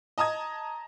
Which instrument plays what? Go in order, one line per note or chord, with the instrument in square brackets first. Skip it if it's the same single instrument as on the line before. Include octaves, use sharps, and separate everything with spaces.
[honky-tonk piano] D#5 A5 A#5 D#6 G#6